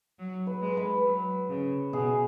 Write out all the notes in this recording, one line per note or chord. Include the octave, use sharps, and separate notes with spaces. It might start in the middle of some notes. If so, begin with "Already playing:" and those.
F#3
B4
G#3
B4
F#3
C#3
B2 G#4